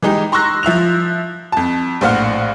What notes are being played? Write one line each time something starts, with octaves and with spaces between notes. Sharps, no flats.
E3 G#3 D#4 G4
A#5 C6 C#6 E6 F#6 A#6
F3 E5 F#6 F7
F2 A5
A#1 A2 C5 F5 F#5 F6